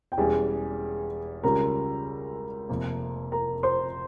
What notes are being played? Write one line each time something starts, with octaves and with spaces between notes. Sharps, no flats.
G5
E1 E2 E3 G3 C#4 G#4 G#5
C#2 C#3 G3 C#4 F4 A#4 A#5
F1 F2 C3 F3 A#3
A#4 A#5
C5 C6